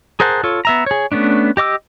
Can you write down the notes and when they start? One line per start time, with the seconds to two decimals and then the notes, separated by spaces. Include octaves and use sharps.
0.20 G#4 A#4 C5 F#5 A5
0.44 F4 A4 C#5
0.65 B3 E5 A#5
0.86 G#4 C#5
1.12 A3 B3 C#4 D4
1.57 G4 D#5 D6 E6